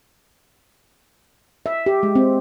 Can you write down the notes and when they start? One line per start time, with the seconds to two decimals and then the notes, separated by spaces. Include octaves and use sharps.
1.66 E5
1.86 G4
2.03 G#3
2.15 C4